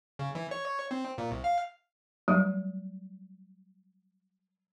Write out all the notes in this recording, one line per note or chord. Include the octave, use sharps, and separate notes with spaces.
C#3
E3
C#5
C4
A#2
C2
F5
F#3 G3 A3